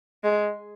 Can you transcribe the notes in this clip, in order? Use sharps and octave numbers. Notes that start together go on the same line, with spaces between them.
G#3